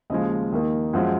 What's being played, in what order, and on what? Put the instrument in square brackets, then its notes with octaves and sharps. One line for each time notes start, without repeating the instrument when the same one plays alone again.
[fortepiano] D#2 C#3 F3 G#3 D#5
D#2 D#3 A#3
F#2 F3 G#3